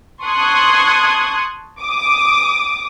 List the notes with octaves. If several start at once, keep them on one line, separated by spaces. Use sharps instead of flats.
A5 C6 C#6 D#6 F#6 G#6
D6 D#6